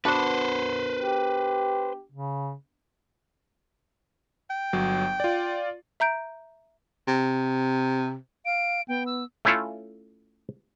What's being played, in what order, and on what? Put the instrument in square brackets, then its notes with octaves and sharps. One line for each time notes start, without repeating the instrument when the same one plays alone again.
[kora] B3 D4 F#4 [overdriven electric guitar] B4 C5
[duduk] G4
C#3
[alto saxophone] G5
[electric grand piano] G1 F#3
F4 D5
[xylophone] E5 A#5 G6 D7
[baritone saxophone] C3
[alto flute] F5 [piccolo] D7
[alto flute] B3 [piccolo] G5
[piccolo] E6
[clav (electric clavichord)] A3 C#4 E4 F4 A4